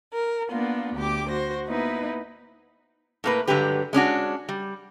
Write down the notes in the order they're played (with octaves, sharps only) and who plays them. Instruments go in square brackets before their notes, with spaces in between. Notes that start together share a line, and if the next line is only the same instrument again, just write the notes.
[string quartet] A#4
A#3 B3 D4 F4
D2 G4 D6
F#4 C5 A#6
A#3 B3 D#4 E4 B4
[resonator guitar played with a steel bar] A2 A#3 B4
G2 D3 F#3 G#3 G4 B4
G#3 C#4 D4 F#4
G3